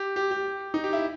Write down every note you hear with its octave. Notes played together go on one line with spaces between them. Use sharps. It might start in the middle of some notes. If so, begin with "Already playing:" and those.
Already playing: G4
G4
G4
D#4
G4
E4